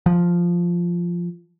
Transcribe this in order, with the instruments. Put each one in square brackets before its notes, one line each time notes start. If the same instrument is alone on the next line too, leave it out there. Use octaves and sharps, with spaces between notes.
[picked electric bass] F3